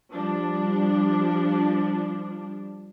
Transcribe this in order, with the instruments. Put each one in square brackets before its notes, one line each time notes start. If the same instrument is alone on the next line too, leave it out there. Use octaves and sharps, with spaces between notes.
[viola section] F3 G3 D4